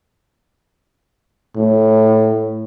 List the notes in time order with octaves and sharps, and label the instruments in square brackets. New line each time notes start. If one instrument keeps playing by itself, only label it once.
[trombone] A2